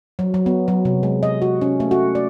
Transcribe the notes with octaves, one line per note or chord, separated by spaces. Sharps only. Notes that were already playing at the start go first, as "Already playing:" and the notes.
F#3
F#3
B3
F#3
C3
G#3
D#5
F#4
C#4
A3
F#4
D5